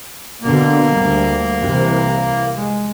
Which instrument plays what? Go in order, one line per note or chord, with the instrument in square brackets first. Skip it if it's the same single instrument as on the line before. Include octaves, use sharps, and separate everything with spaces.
[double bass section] B2 D3 [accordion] A#3
[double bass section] D2 G3
C2 C3 E3
G#3